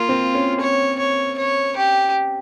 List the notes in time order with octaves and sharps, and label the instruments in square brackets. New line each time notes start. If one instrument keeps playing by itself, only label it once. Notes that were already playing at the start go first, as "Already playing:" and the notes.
Already playing: [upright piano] A#3 [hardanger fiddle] F4
[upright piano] C4
C#4
[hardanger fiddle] C#5
C#5
C#5
G4